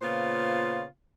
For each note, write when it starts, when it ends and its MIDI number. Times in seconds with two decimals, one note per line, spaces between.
0.02 0.84 46
0.02 0.84 49
0.02 0.84 59
0.02 0.84 65
0.02 0.84 72